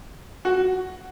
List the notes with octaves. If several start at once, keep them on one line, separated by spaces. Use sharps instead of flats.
F#4